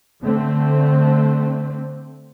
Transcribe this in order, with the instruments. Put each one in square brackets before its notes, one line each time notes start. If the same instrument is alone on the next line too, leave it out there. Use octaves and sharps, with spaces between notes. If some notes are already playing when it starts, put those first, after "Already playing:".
[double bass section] D3 A3 C4